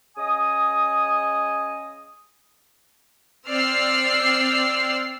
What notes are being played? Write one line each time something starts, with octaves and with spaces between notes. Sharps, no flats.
C#3 D#5 G#5 D#6
C4 D5 E6 F6 C7